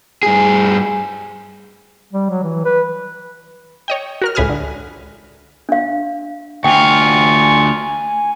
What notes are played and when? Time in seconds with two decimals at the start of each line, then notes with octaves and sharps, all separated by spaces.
0.23 G2 G#4
2.13 G3
2.30 F#3
2.43 E3
2.65 B4
3.88 C#5 D#5 G5
4.22 F#4 A#4 F6
4.35 C#2 A2 B4 G#5 D#6 F6
4.49 D3
5.69 D4 F5
6.64 D2 F4 G5 G#5 C#6